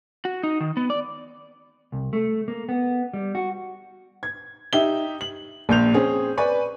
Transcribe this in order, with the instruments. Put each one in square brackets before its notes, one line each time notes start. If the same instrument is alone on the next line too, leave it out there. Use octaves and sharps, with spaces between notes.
[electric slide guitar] F#4
D#4
D#3
B3
D5
[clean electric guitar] C2
A3
A#3
B3
G3
F#4
[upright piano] G#6
D#4 G4 E5 G7
F#7
A#1 A#2 G6 F7
C4 C#4 G#4
B4 D5 G#5 B5 C#6